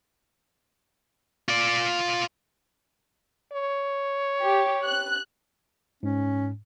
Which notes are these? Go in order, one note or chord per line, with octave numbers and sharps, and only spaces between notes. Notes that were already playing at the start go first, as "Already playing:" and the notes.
F4 D5
C#5
G4
F#6
G#2 C#4